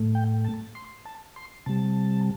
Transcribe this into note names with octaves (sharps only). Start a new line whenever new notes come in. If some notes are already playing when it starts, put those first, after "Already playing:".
Already playing: A2 A3
G5
A5
C6
A5
C6
C3 G3 A5